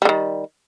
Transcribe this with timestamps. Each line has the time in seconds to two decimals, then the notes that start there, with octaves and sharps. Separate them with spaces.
0.02 G3
0.05 D3
0.09 D#3